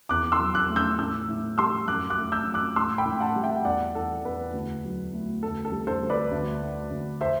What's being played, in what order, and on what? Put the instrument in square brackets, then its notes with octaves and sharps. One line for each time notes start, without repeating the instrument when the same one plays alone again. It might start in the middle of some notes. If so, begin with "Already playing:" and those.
[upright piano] E2 D6 F#6
C6 E6
F#3
D6 F#6
A3
E6 G6
A2 E6 G6
A2
G3 C6 E6
F#2 D6 F#6
D6 F#6
A3
E6 G6
F#2
D6 F#6
A2 C6 E6
G5 B5
A2
F#5 A5
G3
E5 G5
E2 D5 F#5
E3 A4
E2 B4
D2
F#3
A3
D2 A4
A4
G3
A4 C5
D2
B4 D5
D2
A3
D2
C5 E5